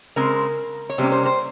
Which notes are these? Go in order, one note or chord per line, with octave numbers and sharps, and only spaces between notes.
C#3 G#3 C4 A#4
C#5
C3 G3 A#3 C#4 C5
C5
C5